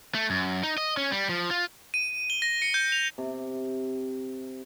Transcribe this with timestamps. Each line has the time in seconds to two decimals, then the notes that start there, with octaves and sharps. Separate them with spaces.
0.15 A3
0.30 F#2
0.63 D#4
0.78 D#5
0.97 C#4
1.12 G3
1.29 F3
1.51 F4
1.94 D#7
2.30 G7
2.42 A#6
2.62 C#7
2.74 G6
2.92 F7
3.18 C3